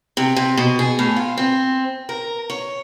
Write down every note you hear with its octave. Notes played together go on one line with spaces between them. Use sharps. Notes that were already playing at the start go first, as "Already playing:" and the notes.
C3
C3
B2
G#4
A2
F4
C4
A#4
C#5